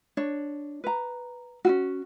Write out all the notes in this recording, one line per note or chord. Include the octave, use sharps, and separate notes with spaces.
D4 C#5
B4 A#5
C#4 F4 F#4